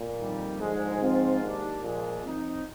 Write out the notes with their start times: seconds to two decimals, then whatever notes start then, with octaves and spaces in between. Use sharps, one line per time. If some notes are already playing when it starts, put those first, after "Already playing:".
Already playing: A#2
0.19 F2 D#3 G3
0.59 G#2 D3 F3 G#3
1.01 F3 C4 F4
1.41 D#3 A#3 D4 G4
1.82 A#2 F3 G#3 D4
2.23 F3 C4 D#4